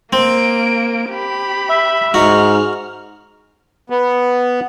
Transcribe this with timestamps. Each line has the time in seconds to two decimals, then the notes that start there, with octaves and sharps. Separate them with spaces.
0.13 A#3 C4 D7
1.11 G4 B5
1.69 E5
2.14 G#2 D#4 F#4 F6
3.90 B3